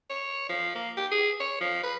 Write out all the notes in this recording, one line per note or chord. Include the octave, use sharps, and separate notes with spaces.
C#5
F3
A#3
G4
G#4
C#5
F3
B4